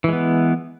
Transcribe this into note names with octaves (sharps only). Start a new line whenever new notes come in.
E3 G#3 B3